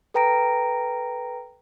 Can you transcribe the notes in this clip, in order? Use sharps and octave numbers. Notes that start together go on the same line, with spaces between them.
A4 B4 G5 A#5 A#6 D7